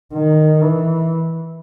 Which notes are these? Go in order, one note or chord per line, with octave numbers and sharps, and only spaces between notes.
D#3
E3